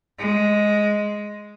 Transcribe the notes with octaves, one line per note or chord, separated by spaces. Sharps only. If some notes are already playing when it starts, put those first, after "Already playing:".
G#3